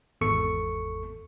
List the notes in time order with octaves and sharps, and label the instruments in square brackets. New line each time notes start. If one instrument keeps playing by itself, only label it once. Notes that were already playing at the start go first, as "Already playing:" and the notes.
[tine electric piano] G#1 E2 A4 C#6 C#7